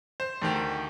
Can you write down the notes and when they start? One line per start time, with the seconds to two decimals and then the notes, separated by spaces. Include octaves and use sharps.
0.20 C5
0.42 D2 D#3 G4